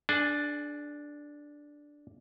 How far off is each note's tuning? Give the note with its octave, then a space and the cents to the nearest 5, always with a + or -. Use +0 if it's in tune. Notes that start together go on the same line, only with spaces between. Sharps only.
D4 +0 G#4 +35 G#5 -15